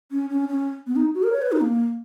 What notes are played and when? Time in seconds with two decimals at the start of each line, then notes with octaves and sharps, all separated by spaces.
0.11 C#4
0.30 C#4
0.49 C#4
0.87 B3
0.96 D#4
1.15 F#4
1.23 A#4
1.32 C#5
1.42 B4
1.52 D#4
1.61 A#3